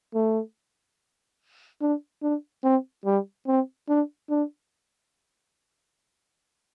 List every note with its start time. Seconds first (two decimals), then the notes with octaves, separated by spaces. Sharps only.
0.15 A3
1.81 D4
2.23 D4
2.64 C4
3.05 G3
3.47 C4
3.89 D4
4.30 D4